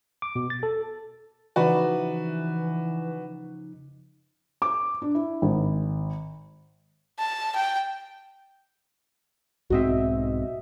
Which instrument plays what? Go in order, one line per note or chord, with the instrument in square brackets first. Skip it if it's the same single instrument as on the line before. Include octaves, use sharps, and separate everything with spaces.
[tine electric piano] D6
B2
A6
A4
[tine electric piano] C#3 F3 D#4 [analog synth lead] E3 [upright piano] F#4 B4 D5
[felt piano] D6
D4
E4
G#1
[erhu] A5
G5
[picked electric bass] B1 G#2 C4 [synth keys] F#4 D#5 E5